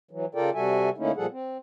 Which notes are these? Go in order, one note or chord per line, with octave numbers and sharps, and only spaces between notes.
E3 F#3
C#3 F4 A4 A#4 D5 G5
C3 G3 F#4 A4 E5 G#5
D3 A3 A#3 C#4 D#4 E4
A#2 F3 G3 G#4 A4 F#5
C4